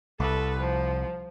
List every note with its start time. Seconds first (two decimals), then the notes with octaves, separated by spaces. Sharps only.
0.20 C2 A4 B4
0.60 F3